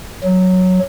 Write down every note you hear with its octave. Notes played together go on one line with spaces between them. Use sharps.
F#3